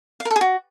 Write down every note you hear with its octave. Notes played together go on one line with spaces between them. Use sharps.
F5
A#4
A4
G#4
F#4